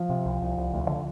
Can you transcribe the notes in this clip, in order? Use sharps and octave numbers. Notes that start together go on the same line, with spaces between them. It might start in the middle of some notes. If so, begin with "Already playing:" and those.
Already playing: F3
C3
C2
C2
C2
D2
D3